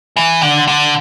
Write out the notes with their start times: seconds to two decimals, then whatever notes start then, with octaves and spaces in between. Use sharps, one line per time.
0.16 E3
0.41 D3
0.67 D3